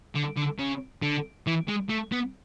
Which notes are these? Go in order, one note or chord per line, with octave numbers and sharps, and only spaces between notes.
D3
D3
C#3
D3
E3
G#3
A3
B3